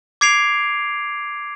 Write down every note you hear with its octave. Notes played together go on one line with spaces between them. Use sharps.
D6 G#6 C7 D7 F7